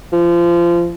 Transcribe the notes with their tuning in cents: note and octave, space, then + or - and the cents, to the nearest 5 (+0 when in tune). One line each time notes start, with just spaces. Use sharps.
F3 -25